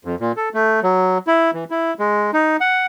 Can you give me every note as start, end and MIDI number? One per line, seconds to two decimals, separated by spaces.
0.05 0.15 41
0.20 0.32 46
0.37 0.49 69
0.54 0.80 57
0.83 1.18 54
1.27 1.51 64
1.54 1.64 52
1.71 1.94 64
1.99 2.31 56
2.34 2.57 63
2.61 2.86 78